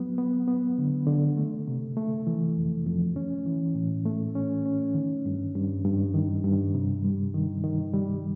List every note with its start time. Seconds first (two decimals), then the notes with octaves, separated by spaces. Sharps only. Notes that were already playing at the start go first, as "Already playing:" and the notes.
Already playing: F#3 B3
0.18 B3
0.48 B3
0.78 D3
1.07 D3
1.37 A3
1.68 C3
1.97 A3
2.27 E3
2.57 F2
2.86 F2
3.16 C#4
3.46 E3
3.75 A2
4.05 A3
4.35 C#4
4.65 C#4
4.95 D#3
5.26 G2
5.55 G2
5.85 G2
6.14 D#3
6.44 G2
6.75 C3
7.04 G3
7.34 D#3
7.64 D#3
7.94 G3